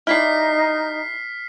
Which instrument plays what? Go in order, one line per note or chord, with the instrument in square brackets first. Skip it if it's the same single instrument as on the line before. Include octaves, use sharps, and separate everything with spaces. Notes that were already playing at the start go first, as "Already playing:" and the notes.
[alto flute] D#4 [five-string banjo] E4 G4 D5 [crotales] F6 B6 C7